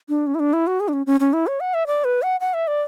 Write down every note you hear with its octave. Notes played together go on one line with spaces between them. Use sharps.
D4
C#4
E4
D4
E4
F#4
G#4
D4
C#4
C#4
C#4
E4
C#5
F#5
E5
D5
B4
F#5
F#5
E5
D5